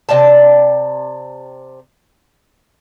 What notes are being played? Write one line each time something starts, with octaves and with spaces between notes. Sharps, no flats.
C3 D5 G5 A5